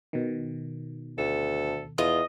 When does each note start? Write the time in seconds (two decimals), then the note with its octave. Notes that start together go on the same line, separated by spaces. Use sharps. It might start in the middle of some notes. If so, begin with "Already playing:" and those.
0.13 B2 D#3
1.18 D2 A4
1.98 E2 F4 D#5